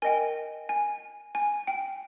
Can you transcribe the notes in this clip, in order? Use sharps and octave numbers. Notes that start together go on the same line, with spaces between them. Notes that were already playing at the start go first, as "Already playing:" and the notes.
A#4 D#5 G5 G#5
G#5
G#5
G5